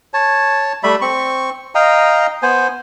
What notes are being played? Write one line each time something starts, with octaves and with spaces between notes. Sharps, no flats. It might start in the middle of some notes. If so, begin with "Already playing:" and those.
C#5 A5
G3 A3 E5 B5
C4 C#6
D#5 F5 G5 A#5
B3 C5 G#5